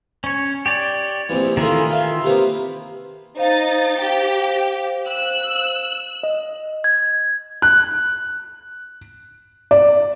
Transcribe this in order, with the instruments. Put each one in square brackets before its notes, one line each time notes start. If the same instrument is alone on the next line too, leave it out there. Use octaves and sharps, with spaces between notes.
[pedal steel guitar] C#4 C#5
G4 C#5 D5
[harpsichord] A#1 C3 E3
[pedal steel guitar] D#3 E3 F4 [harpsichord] A3 E4 G#4
[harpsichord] E5 F5 G5
C3 A#3 B3
[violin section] D#4 A6 [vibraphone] C5 F5
[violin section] G4
E6 F#6
[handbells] D#5
G#6
[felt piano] F#6
D5